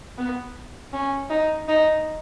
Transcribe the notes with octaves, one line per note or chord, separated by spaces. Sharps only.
B3
C#4
D#4
D#4